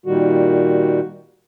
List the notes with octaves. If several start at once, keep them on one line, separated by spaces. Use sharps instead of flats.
A#2 D#3 G3 F#4